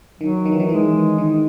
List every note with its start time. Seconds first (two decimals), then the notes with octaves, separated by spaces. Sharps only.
0.20 D#3 F#3
0.46 D#3
0.52 E3
0.60 D#3
0.69 E3 G#3
1.18 D#3